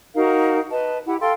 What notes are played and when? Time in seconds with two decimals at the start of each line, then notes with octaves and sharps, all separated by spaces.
0.15 D#4 F#4 A#4 F5
0.71 B4 D#5 A5
1.07 E4 G4 F#5
1.20 A4 F5 G5 C6